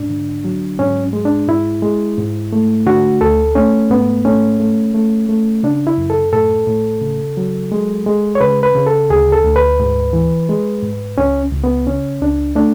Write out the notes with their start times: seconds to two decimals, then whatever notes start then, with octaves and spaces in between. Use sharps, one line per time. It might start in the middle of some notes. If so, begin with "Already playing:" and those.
Already playing: G#2 D4
0.10 D3
0.45 F#3
0.79 G#2 C#4
1.13 G#3
1.25 D4
1.48 G#2 E4
1.82 G#3
2.18 G#2
2.53 A3
2.86 D3 F#4
3.21 D2 A4
3.55 A3 C#4
3.90 G#2 B3
4.25 A3 C#4
4.60 A3
4.95 A3
5.29 A3
5.63 C#3 D4
5.87 E4
5.98 F#2
6.10 A4
6.33 A2 A4
6.67 A2
7.02 C#3
7.37 F#3
7.72 G#3
8.06 G#3
8.35 C#5
8.41 C#3 B4
8.63 B4
8.75 C#3
8.87 A4
9.10 D2 G#4
9.32 A4
9.44 D2
9.56 B4
9.80 G#2
10.13 E3
10.49 G#3
10.82 G#2
11.18 C#2 C#4
11.53 C#2
11.64 B3
11.86 C#3 C#4
12.21 C#2 D4
12.55 A3 D4